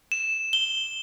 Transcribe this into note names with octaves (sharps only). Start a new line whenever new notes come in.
E7
G7